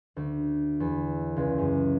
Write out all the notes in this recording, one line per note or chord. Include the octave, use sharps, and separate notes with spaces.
D2
E2
C#2
F#2